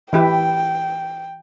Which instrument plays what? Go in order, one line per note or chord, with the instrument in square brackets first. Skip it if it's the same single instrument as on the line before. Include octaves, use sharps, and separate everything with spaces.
[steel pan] E3 E4 G4 [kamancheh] G5